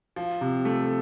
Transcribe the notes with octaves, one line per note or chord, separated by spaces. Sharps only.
F3
C3
A3